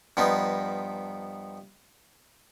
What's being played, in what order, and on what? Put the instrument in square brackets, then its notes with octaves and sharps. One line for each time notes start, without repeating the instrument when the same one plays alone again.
[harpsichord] G2 F3 B3 D#4